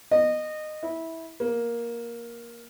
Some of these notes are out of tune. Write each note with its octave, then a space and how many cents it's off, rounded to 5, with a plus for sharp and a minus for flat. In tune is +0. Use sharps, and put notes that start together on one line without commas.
D#5 -20
E4 -15
A#3 +10